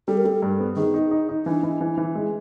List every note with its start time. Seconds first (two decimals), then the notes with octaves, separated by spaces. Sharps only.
0.08 G3 A4
0.17 A#4
0.25 G3 A4
0.42 G2
0.59 B3
0.76 D#3 G#4
0.94 D#4
1.11 D#4
1.29 D#4
1.46 E3 D4
1.63 E3
1.81 E3
1.97 E3
2.15 G#3